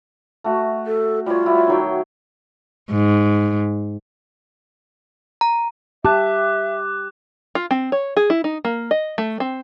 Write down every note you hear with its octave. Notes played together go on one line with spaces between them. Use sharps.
A3 F#4
A4
G3 F4 C#5
G3 E4 F#4
D#3 F#3 G5
G#2
A#5
G4 E5 A5 D6 F#6
F4
C4
C#5
G#4
E4
D#4
A#3
D#5
A3
C4